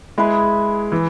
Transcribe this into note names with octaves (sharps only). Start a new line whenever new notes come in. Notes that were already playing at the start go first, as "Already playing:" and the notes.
G#3 E4 G#4 B4
E3